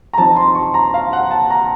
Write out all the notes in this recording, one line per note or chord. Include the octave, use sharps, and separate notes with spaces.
A#5
F3 C4 D#4 A5
C6
C#6
A#5
F5
F#5
A5
A#5